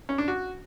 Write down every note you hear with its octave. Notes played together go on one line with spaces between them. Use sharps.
C#4
D4
F#4